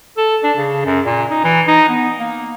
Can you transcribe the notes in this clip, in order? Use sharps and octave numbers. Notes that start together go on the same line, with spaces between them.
A4
D4
C#3
F#2
A#2
D#4
E3
D#4
B3
A#3